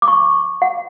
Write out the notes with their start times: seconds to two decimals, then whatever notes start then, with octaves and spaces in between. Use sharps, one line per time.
0.02 D6
0.08 C#6
0.62 F#5